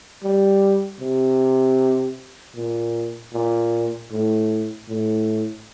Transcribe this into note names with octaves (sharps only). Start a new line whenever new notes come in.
G3
C3
A#2
A#2
A2
A2